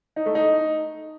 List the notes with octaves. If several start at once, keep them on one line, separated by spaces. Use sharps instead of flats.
D#4
A3
D#4